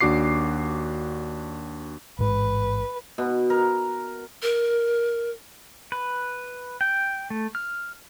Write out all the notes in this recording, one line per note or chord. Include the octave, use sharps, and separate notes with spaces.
D#2 D4 F#4 D6 C7
A1 G#2 G#3 B4
B2
A#4
A#4
B4
G5
A3
F6